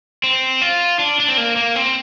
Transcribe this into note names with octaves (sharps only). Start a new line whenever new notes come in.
C4
F4
D4
D4
C4
A#3
A#3
C4